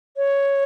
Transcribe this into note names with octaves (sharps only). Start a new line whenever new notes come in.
C#5